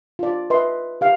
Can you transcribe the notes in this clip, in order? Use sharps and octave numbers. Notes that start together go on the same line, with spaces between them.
F4 D5
B4 D#5 E5 C6
G4 F5